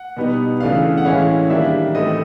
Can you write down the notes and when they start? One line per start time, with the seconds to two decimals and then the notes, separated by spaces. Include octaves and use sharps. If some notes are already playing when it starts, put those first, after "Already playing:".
Already playing: F#5
0.17 B2 G3 B3 D#4
0.60 C#3 E3 A3 D4 F5
0.97 F#5
1.05 A2 E3 G#3 C#4 E4 F5
1.50 D#3 G3 A#3 D4 E5
1.94 A2 E3 A3 C4 E4 D#5